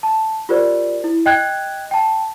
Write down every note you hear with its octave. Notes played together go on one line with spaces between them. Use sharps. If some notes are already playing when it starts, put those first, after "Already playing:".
A5
F4 G4 A#4 C5 D5
E4
D#5 G5 F#6 G#6
G5 A5